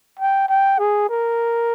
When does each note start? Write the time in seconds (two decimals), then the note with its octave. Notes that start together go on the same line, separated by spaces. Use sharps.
0.19 G5
0.49 G5
0.79 G#4
1.09 A#4